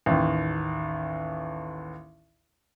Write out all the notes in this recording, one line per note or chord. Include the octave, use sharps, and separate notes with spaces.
A1 D#2